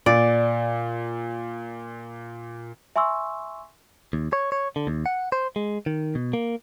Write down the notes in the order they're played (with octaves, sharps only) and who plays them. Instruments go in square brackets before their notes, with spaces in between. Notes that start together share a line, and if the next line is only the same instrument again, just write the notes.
[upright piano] A#2 [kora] D5
[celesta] E5 G#5 C6 C#6 E6
[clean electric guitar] D#2
C#5
C#5
D3
D#2
F#5
C5
G#3
D#3
B2
A#3